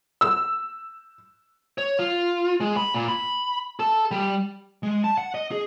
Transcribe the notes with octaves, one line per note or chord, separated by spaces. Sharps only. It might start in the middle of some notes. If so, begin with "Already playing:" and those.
E6
C#5
F4
G#3
B5
A#2
B5
A4
G3
G#3
A5
F#5
D#5
G#4